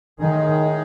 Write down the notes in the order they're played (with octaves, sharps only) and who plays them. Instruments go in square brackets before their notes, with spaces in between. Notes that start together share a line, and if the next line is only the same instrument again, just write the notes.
[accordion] A2 G#3 D#4 G#4 [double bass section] D#3